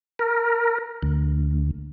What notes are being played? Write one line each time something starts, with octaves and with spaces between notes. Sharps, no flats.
A#4
D2